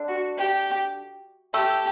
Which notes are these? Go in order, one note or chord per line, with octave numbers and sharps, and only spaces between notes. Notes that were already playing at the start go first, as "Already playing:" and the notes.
Already playing: D3 D4
F#4
G4
A3 G4 A4